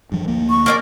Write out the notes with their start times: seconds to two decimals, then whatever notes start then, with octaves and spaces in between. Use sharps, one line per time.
0.12 G2 F3
0.28 D2 A#3
0.50 C#6
0.66 A#3 D4 D5